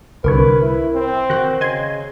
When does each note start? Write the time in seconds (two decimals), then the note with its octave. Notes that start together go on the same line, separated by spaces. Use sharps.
0.24 C2 D3 A#4 B4 C#5
0.62 E4
0.94 C4
1.30 D#3 F#4 F#6
1.61 C#3 D#5 G#5 C6 G#6